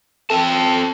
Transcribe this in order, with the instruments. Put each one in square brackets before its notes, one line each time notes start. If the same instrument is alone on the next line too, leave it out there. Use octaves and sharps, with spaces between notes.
[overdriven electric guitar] C4 A5 [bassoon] A4